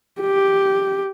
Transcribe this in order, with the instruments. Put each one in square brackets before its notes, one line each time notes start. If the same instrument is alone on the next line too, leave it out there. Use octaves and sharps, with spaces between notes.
[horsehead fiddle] G4